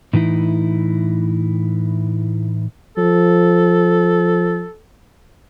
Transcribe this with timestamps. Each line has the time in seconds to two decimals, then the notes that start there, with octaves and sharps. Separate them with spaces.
0.13 A2 E3 D#4 E4
2.97 F3 A4